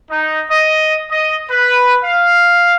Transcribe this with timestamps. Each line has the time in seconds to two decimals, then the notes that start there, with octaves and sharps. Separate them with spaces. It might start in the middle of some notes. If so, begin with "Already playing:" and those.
0.10 D#4
0.51 D#5
1.11 D#5
1.50 B4
2.04 F5